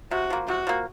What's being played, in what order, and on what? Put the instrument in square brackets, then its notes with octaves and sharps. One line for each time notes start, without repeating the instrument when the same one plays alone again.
[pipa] C3 [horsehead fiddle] F#4
[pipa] F3 A#3
[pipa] C3 [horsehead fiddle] F#4
[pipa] F3 A#3